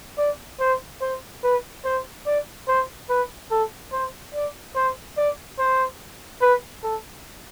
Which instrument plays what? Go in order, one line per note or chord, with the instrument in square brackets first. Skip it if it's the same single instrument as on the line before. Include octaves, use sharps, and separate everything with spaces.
[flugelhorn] D5
C5
C5
B4
C5
D5
C5
B4
A4
C5
D5
C5
D5
C5
B4
A4